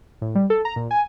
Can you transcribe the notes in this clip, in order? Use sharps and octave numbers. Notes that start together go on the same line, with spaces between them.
A2
G3
A4
A#5
A#2
G#5